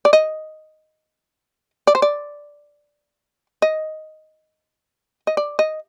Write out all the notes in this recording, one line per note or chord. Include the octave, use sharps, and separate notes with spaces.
D5
D#5
D5
C5
D5
D#5
D#5
D5
D#5